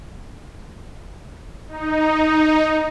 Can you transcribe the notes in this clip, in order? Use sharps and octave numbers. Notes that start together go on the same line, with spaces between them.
D#4